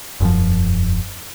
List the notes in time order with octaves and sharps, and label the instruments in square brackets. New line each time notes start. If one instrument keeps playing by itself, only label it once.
[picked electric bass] E1 F#2 F3